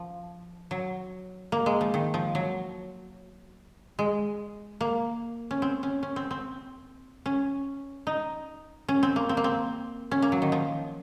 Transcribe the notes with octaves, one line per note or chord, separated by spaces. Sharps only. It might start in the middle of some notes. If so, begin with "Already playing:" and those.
Already playing: F3
F#3
A#3
G#3
F3
D#3
F3
F#3
G#3
A#3
C#4
C4
C#4
C#4
C4
C4
C#4
D#4
C#4
C4
A#3
C4
A#3
C4
C#4
A#3
F#3
D#3
F3